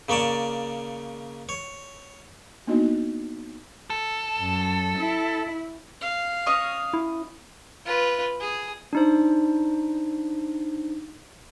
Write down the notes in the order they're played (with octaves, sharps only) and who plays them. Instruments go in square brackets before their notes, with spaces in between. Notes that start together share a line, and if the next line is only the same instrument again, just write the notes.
[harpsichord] C#3 A#3 C#5 D5 A5
C#5
[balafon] A#3 B3 D4 D#4 F#4 D#5
[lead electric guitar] A4
[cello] F#2
E4
[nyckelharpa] F5
[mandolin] C#4 D#5 C#6
[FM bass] E4
[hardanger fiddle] F4 B4
G#4
[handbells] D4 D#4 C5